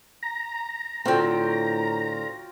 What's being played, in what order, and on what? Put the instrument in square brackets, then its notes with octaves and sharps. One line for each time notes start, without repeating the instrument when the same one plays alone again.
[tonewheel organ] A#5
[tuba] A2 [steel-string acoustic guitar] D3 C4 [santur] F4 F#4 G5